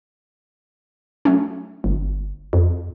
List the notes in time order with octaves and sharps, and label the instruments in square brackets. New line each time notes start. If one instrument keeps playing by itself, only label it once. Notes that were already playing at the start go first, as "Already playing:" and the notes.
[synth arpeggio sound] F#3 A3 C#4
[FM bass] G1
F2